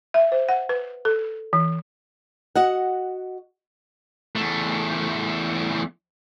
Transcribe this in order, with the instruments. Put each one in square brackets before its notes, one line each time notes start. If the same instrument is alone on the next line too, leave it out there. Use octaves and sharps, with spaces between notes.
[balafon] E5
C5
F#5
B4
A4
E3
[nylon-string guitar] F#4 D#5 F#5
[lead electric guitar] E2 A3